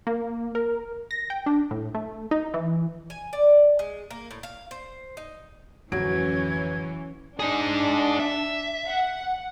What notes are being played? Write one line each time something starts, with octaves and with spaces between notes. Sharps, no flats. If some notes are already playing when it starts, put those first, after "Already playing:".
A#3
A#4
A#6
G5
D4
A2
A3
D#4
E3
G#5
D5
G#3
A#3
A2
F5
C5
D#4
D1 F2 E3 F#3 C#4 G#6 D7
D4 D#4 G#4
E5
F#5